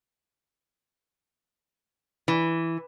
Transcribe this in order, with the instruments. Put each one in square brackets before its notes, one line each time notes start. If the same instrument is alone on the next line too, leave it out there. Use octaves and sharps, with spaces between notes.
[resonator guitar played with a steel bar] E3